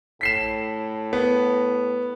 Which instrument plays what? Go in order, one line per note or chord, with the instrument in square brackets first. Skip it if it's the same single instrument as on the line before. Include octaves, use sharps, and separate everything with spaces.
[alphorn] A2 [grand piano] B6 C7 E7
[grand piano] B3